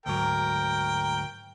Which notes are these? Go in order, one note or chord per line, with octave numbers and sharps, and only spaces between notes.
D2 G#2 F#3 A#4 G5